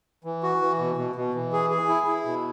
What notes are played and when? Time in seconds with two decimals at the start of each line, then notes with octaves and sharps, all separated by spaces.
0.24 E3
0.43 F#4
0.61 E3
0.79 B2
0.97 B2
1.16 B2
1.34 E3
1.53 G#4
1.70 G#4
1.88 E4
2.07 E4
2.25 B2